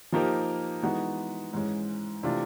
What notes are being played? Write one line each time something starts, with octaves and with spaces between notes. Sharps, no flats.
F3 A#3 D#4 G4 A#4
E3 G#3 B3 D#4 F#4
G#2 E3 G#3 C#4
C3 E3 A3 D4 F4